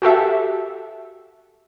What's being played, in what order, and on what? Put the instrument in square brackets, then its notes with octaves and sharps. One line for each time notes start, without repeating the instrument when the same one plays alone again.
[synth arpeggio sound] F#4 G4 A4 E5